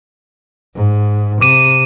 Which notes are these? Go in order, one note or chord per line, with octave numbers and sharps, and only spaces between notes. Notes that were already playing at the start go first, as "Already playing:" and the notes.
G#2
C3 D6 D#7